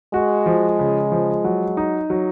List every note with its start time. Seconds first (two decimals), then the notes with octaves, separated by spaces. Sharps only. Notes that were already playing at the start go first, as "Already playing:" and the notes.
0.14 G#3 F#4
0.46 F3
0.79 C#3
1.12 F3
1.44 F#3
1.77 D#4
2.10 F#3